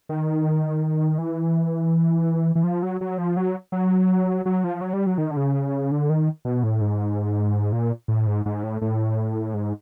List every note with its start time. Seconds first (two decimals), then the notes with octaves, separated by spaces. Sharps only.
0.09 D#3
1.18 E3
2.55 E3
2.64 F3
2.83 F#3
3.01 F#3
3.18 F3
3.37 F#3
3.72 F#3
4.46 F#3
4.64 F3
4.81 F#3
4.93 G3
5.06 F#3
5.18 D#3
5.31 D3
5.37 C#3
5.91 D3
6.09 D#3
6.45 B2
6.63 A2
6.81 G#2
7.73 A#2
8.08 A2
8.27 G#2
8.46 G#2
8.63 A2
8.82 A2
9.54 G#2